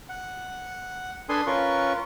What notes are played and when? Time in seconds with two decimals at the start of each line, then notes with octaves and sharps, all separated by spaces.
0.09 F#5
1.29 D4 A4 B4 G#5 C6 D#6
1.47 C#4 F4 A#4 B4 C#6